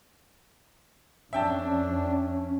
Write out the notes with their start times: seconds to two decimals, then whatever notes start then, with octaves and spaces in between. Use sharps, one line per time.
1.33 F2 C#4 D4 E5 G5 A5